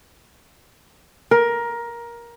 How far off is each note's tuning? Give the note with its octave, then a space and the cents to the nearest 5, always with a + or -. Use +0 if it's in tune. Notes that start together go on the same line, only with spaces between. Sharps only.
A#4 +15